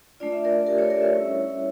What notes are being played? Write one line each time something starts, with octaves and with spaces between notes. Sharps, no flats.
A3 D4 F4 D5
E5
A#4 D5
G4 A#4
A4 C#5
A#4 D5
C#5 E5
G3 C#4 E4